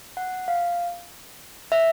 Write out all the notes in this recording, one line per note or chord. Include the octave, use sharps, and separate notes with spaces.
F#5
F5
E5